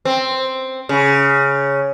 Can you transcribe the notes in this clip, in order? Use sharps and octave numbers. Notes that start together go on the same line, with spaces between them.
C4
C#3